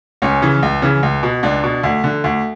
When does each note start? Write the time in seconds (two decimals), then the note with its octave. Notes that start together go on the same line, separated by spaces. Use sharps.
0.22 C#2 C#4
0.42 C#3 E3
0.62 C#2
0.82 C#3 E3
1.03 C#2
1.23 B2
1.43 C#2 D4
1.63 B2
1.83 D2
2.04 D3
2.24 D2